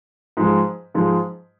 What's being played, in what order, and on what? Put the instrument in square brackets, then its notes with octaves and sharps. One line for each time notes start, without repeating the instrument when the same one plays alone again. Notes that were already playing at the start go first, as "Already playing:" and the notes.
[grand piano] G#2 F3 G#3
G#2 F3 G#3